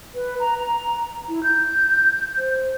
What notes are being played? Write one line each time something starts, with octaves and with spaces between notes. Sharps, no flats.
B4
A#5
A#5
E4
G6
C5